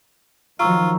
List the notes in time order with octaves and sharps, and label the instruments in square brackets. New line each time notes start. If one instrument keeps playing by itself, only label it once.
[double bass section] D#3 F3 F#3 [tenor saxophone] F4 [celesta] A#5 C#6 E6